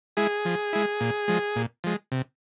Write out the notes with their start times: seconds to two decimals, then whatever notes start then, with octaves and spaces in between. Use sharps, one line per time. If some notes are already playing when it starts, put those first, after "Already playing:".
0.17 G#3 E4 G#4
0.45 F3
0.73 G#3 E4
1.01 A#2
1.28 F3 G#3
1.56 A#2
1.84 F3 G#3
2.12 C3